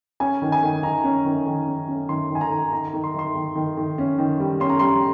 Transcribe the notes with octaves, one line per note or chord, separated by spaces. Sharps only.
C#4 G#5
D#3
G#5
D#3
D#3 A#5
C#4
D#3
D#3
C#4
C#4
D#3 C6
D#3 G#5
A#5
D#3
D#3 A#5
A#5
D#3
C6
D#3 C6
D#3
D#3
D#3
C#4
D#3
G3
C#4 C6
A#5
G3 C6